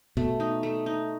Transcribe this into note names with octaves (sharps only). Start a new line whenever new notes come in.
B2 A3
D#4
A3
D#4